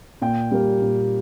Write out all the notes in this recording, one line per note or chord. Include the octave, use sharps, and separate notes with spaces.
A#2 G5
G3 A#3
A#2